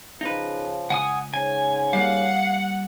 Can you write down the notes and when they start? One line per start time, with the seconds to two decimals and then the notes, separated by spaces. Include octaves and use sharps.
0.21 C#3 F3 D#4 B4
0.90 C#2 F#5 G#5 D#6
1.34 G#2 C#4 G#5
1.93 G3 A#3 F5 F#5